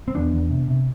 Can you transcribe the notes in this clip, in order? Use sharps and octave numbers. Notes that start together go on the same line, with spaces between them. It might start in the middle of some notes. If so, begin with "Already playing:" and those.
C4
E2 B3 D4
E2
C3
C3